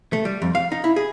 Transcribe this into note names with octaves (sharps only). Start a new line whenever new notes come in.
A3
G3
F2
F5
D#4
E4
G#4